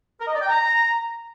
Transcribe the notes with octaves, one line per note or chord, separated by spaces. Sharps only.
A#4
D#5
D5
G5
A#5